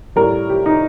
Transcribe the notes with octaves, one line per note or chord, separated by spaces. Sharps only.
A2 G3 A#4
G4
D#4